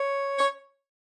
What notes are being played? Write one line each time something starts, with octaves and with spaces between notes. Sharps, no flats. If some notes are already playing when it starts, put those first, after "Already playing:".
Already playing: C#5
C#5